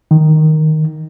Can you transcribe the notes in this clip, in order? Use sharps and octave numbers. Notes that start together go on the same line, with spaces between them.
D#3